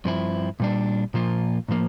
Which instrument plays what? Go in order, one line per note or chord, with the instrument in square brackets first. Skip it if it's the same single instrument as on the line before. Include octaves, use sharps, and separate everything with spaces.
[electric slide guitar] G2 F3 C4 E4
A#2 G3 D4
A#2 F3 A#3 F4
A2 F3 A#3